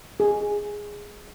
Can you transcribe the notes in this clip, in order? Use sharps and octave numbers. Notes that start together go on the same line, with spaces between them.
G#4